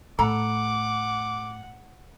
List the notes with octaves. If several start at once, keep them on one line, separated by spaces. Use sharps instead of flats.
A2 A4 F#5 A#5 D6